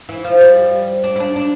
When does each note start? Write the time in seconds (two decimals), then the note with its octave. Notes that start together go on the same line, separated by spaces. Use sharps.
0.09 E3
0.24 F3
0.41 G3
1.04 D4
1.16 E4
1.20 D4
1.36 D4